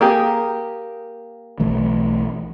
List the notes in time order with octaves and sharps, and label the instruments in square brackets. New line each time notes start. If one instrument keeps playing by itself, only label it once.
[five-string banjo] A#3 G4 G#4
[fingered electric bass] B1 E3 A3